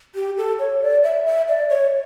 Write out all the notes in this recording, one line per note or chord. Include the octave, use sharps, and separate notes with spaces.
G4
A4
C#5
D5
E5
E5
D5
C#5